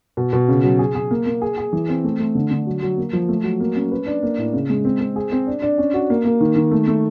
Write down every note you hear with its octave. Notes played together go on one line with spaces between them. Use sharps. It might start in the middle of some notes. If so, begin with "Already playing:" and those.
B2
B2
C#3
F#3
G#4
G#4
A#3
A#3
G#4
G#4
E3
C4
A3
A3
D3
D3
F#3
F#3
A#3
F3
A3
F#3
A#3
C#4
B4
D4
A#3
A2
C#3
G#3
C4
C4
G#4
C4
D4
D4
C#4
F#4
A#3
A#3
D#3
D#3
A3
A3